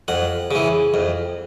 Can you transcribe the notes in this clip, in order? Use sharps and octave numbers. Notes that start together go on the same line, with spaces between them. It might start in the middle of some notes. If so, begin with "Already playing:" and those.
F2 F#5
C#3 E3
F2